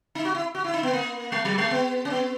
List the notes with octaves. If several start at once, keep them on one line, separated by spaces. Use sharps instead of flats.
D#4
F#4
E4
F#4
E4
D#4
B3
A#3
G#3
F#3
G#3
B3
C#4
B3